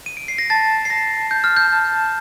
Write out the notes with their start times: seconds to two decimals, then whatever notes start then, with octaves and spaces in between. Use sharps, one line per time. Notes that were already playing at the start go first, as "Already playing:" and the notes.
0.06 D#7
0.17 D7
0.28 C7
0.38 A#6
0.50 A5 A6
0.85 C7
0.90 A5 A#6
1.30 A5 G6
1.44 F6
1.57 G6
1.71 A5